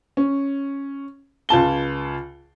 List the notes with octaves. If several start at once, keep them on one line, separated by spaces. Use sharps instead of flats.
C#4
C#2 F4 A5 G7